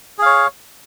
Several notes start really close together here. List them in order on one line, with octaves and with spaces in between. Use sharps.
G#4 F5 C#5